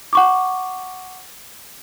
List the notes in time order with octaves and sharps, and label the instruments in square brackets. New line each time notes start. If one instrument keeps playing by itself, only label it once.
[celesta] F#5 C#6 D6